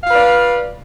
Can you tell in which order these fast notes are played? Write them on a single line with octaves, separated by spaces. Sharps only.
F5 F4 B4 D5